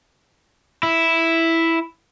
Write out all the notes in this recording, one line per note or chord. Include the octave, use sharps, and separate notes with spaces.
E4